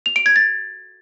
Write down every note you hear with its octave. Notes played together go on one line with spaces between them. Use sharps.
F7
D7
G#6
A6